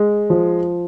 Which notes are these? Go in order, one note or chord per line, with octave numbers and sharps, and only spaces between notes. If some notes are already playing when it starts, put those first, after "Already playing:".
Already playing: G#3
F3